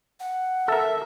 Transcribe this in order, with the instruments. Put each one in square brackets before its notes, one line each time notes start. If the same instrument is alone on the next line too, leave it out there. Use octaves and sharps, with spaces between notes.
[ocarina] F#5
[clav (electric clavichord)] A4 A#4 [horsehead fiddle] E5